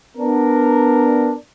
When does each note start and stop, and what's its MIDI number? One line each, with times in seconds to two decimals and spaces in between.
0.17 1.35 59
0.17 1.35 62
0.17 1.35 70